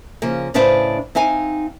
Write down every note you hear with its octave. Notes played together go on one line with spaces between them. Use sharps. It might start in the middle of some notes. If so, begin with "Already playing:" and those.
C#3 F3 A#3
A2 C#3 D4 B4 C5 F5
C4 D#4 F5 G#5